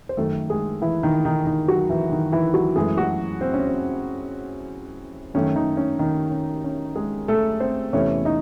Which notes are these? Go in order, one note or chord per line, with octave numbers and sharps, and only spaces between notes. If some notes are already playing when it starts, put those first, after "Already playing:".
C5
F#2 D#3 A3 A4
G#3 G#4
E3 E4
D#3 D#4
D#3 D#4
D#3 D#4
F#3 F#4
E3 E4
D#3 D#4
E3 E4
F#3 F#4
F#2 E3 G#3 A3 G#4
F#3 F#4
C4
C#4
C4
F#2 D#3 A3 C#4
D#3 D#4
C#4
D#3 D#4
C#4
C#4
G#3 G#4
A3 A4
C4 C5
E2 C3 E3 A3 C#4 C#5
D#4 D#5